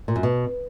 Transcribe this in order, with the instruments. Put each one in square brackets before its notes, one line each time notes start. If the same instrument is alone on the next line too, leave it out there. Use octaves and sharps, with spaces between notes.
[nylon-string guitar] A#2
F#2
B2